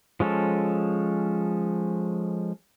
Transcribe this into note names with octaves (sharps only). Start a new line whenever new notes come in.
F3 G#3 C#4 A4